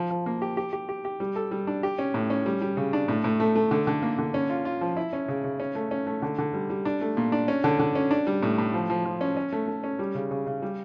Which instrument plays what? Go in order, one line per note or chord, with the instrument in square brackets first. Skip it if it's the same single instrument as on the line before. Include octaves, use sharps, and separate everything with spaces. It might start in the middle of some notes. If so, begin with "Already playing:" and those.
Already playing: [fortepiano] F3
F3
A#3
G4
G4
G4
G4
G4
G3
A4
G3
D4
G4
C#4
A2
C#4
G3
G3
C#3
D4
A2
A2
A3
A3
D3
D3
A#3
D3
C#4
F4
F4
F3
E4
C#4
C#3
C#3
C#4
A3
C#4
A3
D3
D3
G3
G3
D4
A3
A#2
D4
C#4
D3
D3
C#4
D4
G3
A2
A2
F3
F3
F3
C#4
C#4
A3
A3
C#4
G3
C#3
C#3
C#3
G3